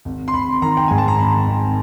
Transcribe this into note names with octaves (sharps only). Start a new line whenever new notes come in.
G#1
C6
G#1 B5
D#3 A#5
G5
G#2 G#5
A5
A#5
G#1 B5
G#1